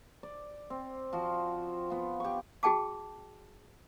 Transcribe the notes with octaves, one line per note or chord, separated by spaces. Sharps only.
D5
C4
F3 F4 F#4
B3 F4
G4 C#6
F#4 G#4 G5 A5 D6